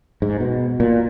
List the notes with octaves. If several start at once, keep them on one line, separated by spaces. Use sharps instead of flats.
G#2
B2
A#2